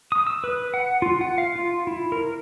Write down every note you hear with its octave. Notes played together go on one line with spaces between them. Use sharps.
D#6
E6
B4
F#5
F4
F#5
F5
F4
E4
A#4